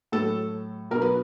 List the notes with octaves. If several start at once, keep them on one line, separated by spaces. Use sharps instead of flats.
A2 F#3 A4
B2 F#3 A#4
B4